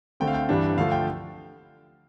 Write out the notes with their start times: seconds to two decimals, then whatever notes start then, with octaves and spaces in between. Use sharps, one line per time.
0.20 D3 A3 C4 G5
0.27 F5
0.34 G5
0.49 G2 E3 G3 D4
0.77 D3 F3 A3 F5
0.92 G5